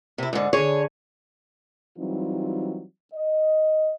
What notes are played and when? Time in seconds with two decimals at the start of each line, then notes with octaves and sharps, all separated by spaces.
0.18 C3 E4
0.33 G#2 D3
0.53 D3 G#4 C#5
1.97 E3 F#3 G3 C4 D#4 F4
3.13 D#5